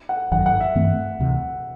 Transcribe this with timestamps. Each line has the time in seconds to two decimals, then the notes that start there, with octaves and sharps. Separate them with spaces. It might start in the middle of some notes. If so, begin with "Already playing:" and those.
0.09 F#5
0.31 G#1 F#2 D#3 F#5
0.46 F#5
0.61 E5
0.75 G2 E3 A3 C4
1.19 D2 C3 E3